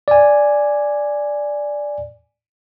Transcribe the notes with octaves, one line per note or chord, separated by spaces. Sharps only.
D5 G#5